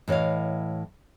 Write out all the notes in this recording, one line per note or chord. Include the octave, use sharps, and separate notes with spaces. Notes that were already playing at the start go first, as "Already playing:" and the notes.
A2 E3 C#5 D#5 F5